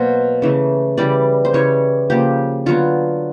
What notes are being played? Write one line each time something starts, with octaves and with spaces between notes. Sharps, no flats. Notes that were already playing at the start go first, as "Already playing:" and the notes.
Already playing: B2 F#3 A#3 C5
C#3 E3 A3
C#3 E3 G3 D5
C5
C#3 E3 G3 C#5
C#3 F3 A#3 G4
D3 F#3 B3 F4